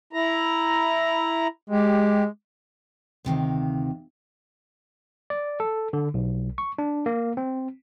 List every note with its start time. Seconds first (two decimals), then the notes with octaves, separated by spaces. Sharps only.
0.13 E4 A#5
1.70 G#3 G4
3.25 D2 C3 D#3 F5
5.30 D5
5.60 A4
5.93 D3
6.14 B1
6.58 C#6
6.78 D4
7.06 A#3
7.37 C4